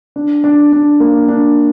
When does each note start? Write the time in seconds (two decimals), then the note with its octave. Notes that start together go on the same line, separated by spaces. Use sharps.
0.16 D4
0.44 D4
0.73 D4
1.00 A#3
1.28 D4